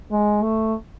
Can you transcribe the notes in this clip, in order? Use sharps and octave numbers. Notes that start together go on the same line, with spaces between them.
G#3
A3